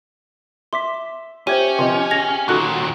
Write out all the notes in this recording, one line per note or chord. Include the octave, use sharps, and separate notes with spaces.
E5 C6 D6 B6
C#4 G4 C5 C#5 E5 G5 G#6 D#7
C3 F3 D#5 C6
G#4 G#6 A#6 F7
D#2 A#2 D#4 F#4 A4 C#6 F#6